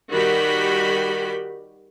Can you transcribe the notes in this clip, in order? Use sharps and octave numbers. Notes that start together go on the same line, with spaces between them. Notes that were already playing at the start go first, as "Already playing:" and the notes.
D#3 G3 F#4 G4 B5